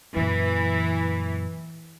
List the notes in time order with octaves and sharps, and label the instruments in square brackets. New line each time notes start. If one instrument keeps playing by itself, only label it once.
[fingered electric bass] F#2 A#2 [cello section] E3